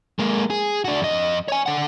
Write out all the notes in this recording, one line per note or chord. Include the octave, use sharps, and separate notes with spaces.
G#3 A#3
G#4
D4 F#4
F2 D#5
C#5 G#5
D3 F#5